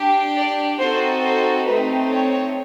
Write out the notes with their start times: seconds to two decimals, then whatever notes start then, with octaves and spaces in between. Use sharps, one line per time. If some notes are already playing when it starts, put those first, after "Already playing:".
Already playing: D4 G4
0.36 D5
0.79 C4 D#4 F#4 A4 C5
1.23 C5
1.66 A3 C4 D#4 B4
2.09 C#5